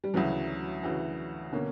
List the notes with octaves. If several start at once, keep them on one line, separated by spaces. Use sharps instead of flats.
G3
D2 C#3 E3 F#3
D2 C#3 E3
B2 D3 A#3 C#4